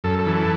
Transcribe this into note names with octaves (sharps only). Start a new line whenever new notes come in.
F#2 A4
A4
E3
A4